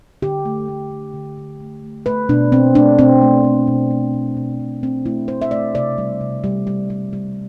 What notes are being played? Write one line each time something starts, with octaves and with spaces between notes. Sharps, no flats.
D3 G4
A3
A3
A3
D3
D3
A3
A3
A3 B4
B2 D4
B2 C4
A3 D4
B2 C4
A3
A3
B2
A3
B2
B2
B2
A3 C4
A3 E4
A3 C5
E5
A3 D5
C3 D5
G3
C3
G3
G3
G3
G3